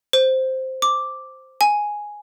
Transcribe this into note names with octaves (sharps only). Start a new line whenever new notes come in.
C5
D6
G#5